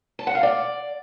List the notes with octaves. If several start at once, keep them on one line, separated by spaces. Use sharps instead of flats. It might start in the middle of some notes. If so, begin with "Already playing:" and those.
A5
F#5
F5
D5